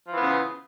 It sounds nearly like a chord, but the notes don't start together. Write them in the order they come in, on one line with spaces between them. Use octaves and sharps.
F3 E3 B3 C#3